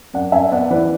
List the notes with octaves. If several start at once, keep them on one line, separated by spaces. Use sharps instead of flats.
F#2 D5 F#5
F#2 E5 G#5
B3 D5 F#5
E3 B4 D5